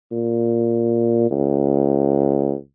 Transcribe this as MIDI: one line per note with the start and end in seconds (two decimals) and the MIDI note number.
0.12 1.28 46
1.31 2.55 37